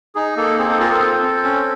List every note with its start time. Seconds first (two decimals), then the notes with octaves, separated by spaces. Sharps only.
0.15 D#4 G#4
0.37 A#3 A4
0.58 C4 G#4
0.69 A4
0.79 F4 G#4 A#4
0.90 A4
1.01 C4
1.22 C4
1.44 C#4